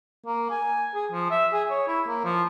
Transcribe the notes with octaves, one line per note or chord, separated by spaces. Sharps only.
A#3
G#5
G#4
F3
E5
G#4
C#5
E4
A#3
F3